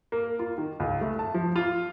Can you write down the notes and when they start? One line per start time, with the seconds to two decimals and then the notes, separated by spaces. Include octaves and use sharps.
0.12 A#3
0.39 F4
0.58 D#3
0.80 C#2
1.01 A3
1.19 A5
1.34 F3
1.56 F4